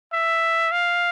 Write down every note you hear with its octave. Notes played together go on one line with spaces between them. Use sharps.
E5
F5